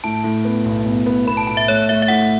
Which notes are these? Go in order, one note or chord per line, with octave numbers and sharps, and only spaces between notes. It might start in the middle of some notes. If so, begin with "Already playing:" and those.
A2 A5
A2
B3
B1
B1
B3
B3 B5
A5
A2 A5
E5
A3 C#5
A3 E5
E5
A2 F#5